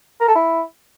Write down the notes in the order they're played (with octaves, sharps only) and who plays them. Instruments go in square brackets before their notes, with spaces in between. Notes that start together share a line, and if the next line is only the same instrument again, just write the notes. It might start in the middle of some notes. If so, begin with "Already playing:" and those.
[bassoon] A#4
A4
E4